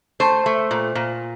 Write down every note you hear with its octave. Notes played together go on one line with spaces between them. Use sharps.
A3 C5
A3
A#2
A#2